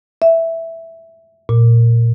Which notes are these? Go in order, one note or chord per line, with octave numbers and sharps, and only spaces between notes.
E5
A#2